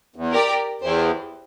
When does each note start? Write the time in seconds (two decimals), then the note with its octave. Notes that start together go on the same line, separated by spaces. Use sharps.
0.16 E2
0.32 G4 A#4 D5 G5
0.82 E2 E4 G4 C5